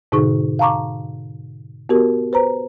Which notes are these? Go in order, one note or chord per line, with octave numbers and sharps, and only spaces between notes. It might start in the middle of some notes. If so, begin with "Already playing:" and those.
G#2 B2 D3 D#4 G#4 C#6
F5 A5 A#5 C#6 D6
B3 F#4 G4 A#4
B4 C5 A#5